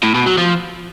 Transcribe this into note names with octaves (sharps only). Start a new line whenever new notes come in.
A2
B2
F#3
F3